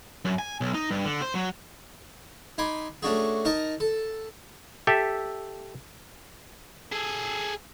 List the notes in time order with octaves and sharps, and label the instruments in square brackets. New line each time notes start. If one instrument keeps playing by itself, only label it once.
[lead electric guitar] F#2
G#5
B1
D#4
G2
D3
C5
F#3
[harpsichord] D#4 G#5 B5 C6 D6
A3 C#4 D4 F#4 G#4
D#4 A#4 D#5 A5
A4
[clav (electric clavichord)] G4 A4 E5
[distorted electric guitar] G#4 A4